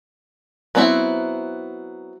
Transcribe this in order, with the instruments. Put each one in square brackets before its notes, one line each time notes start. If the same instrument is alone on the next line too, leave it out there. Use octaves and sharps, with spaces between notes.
[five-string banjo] F#3 B3 C4 D#4 E4